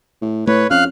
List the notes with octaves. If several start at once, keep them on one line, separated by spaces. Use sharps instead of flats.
A2
A2 A3 B4 C#5
F2 C#4 F5 F6 F#6